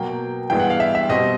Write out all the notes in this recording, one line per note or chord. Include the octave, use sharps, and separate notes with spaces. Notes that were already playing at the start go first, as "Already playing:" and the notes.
Already playing: B2 F#3 A#3 G5
G2 E3 G#3 B3 G5
F#5
F5
E5
E5
B2 G3 C4 D#5